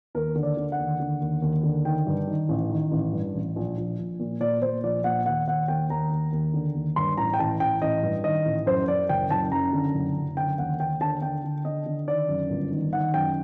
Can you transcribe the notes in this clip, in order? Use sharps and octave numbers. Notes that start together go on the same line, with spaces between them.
D#2 A#4
D3
D5
D3
F#5
D#2
D3
D#2
D#2
D3
D#3 G5
G2
D#3
A1
D#3
A1
G2
A1
A#1
A#1
A#1
A#2
A#2 D5
A#2 C5
A#1 D5
A#2 F#5
D#2 F#5
D#2 F#5
D#2 G5
D#2 A#5
D#2
D#2
D3
D#2
G2 C6
A1 A#5
G5
A1 A5
A1 G5
A1 D#5
G2
D#3 D#5
A1
F#2 C5
F#2 D5
F#1 G5
F#1 A5
F#2 A#5
D3
F#1
F#2
D3 G5
D#2 F#5
D#2 G5
D3 A5
D3 G5
D3
D3 D#5
D3
D#3 D5
F#2
G1
D#3
D#3 F#5
F#2 G5